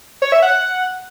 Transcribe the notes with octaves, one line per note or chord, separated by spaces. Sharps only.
C#5
E5
F#5